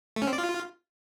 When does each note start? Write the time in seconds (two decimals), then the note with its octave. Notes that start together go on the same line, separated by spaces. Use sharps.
0.16 A3
0.22 C#4
0.27 C4
0.33 D5
0.38 F4